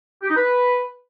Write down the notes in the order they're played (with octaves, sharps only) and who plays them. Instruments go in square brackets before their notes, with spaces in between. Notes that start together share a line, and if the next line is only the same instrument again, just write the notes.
[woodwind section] G4
D#4
B4